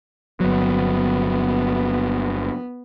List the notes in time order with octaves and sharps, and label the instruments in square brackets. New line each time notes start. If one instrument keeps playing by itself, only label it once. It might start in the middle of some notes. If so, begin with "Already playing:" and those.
[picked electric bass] G1 F#3 [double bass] B3